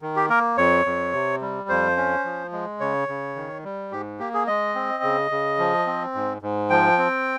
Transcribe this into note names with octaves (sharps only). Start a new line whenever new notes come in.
D#3
G4
A#3 A#4
F2 C#5
F2
C3
G3
F2 C5
C#4
F3
G#3
C#3 C#5
C#3
D#3
G3
G#2 G4
A#3 G4
G#4
G#3 D#5
C4
C#3
C#3
F3
C4
G#2
G#2
F3 G5
C4